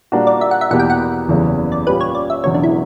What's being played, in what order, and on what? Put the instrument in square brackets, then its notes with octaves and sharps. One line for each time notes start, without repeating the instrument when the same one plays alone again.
[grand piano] A#2 G3 A#3 D4 F#4
[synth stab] D5
E5
F#5
E5
[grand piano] E2 B2 A#3 E4 G4 [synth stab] F#5
[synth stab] G5
F#5
[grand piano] F#1 E2 C#3 E3 G3
[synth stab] D5
[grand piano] A#2 G3 C#4 G4 [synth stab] B4
[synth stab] C#5
D5
E5
[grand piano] E1 E2 C#3 F#3 B3 [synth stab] C#5
[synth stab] D4
E4